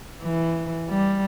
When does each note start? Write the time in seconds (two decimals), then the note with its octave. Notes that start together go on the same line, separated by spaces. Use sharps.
0.22 E3
0.90 G3